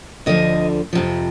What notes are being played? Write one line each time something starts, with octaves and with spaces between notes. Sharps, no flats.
D2 D3 F3 D#5
F2 C3 F3